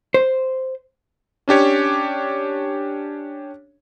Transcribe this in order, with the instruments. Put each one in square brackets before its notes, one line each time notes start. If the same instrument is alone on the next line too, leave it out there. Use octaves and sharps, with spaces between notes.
[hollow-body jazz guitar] C5
[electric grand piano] C#4 D4 G4 C#5